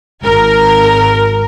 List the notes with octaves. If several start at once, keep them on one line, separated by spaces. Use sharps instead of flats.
G#1 A#4